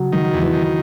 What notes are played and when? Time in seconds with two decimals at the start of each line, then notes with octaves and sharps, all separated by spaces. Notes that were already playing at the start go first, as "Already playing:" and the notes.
Already playing: C#3 F#3
0.12 D#3 F#3
0.34 E2
0.43 E3
0.53 D#3